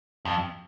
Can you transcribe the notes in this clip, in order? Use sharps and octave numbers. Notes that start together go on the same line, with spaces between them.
F2